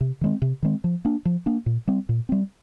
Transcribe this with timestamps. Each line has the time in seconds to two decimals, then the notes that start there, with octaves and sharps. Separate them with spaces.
0.01 C3
0.21 D#3 G#3 C4
0.42 C3
0.63 D#3 G#3 C4
0.84 F3
1.05 A#3 D4
1.25 F3
1.46 A#3 D4
1.66 A#2
1.87 G3 C4
2.09 A#2
2.29 G3 C4